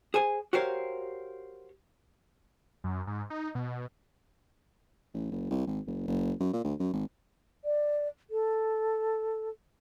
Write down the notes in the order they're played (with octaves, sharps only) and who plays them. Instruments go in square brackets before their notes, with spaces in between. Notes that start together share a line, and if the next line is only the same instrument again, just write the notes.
[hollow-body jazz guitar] G#4 C5 G#5
F#4 G4 A#4 C5 C#5 F5
[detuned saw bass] F#2
G#2
D#4
B2
[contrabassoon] A1
F#1
C2
G#1
F#1
F#1
F#2
A#2
D2
F#2
G#1
[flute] D5
A4